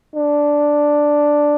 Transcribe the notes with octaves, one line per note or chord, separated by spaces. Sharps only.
D4